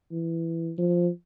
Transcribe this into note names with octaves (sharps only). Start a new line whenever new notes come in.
E3
F3